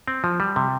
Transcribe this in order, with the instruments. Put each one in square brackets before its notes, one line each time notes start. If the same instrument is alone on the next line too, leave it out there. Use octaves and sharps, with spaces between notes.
[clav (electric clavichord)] C4
F3
G3
C3